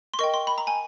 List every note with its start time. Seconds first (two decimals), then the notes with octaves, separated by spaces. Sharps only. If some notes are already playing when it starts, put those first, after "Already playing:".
0.14 C6
0.19 A#4 D#5 G5 C#6
0.34 C6
0.47 B5
0.58 A#5
0.67 G#5